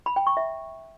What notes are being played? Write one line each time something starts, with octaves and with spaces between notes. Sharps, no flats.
B5
G5
C#6
E5